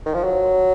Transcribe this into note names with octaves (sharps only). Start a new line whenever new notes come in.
D#3
F3
F#3